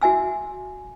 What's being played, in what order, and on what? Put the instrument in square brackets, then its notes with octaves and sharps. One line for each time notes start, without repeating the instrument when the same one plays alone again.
[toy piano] F#4 E5 G#5 E6